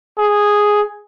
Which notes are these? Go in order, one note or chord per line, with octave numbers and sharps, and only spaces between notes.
G#4